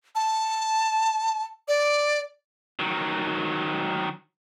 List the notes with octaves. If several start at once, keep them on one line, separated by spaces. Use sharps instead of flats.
A5
D5
D#3 F#3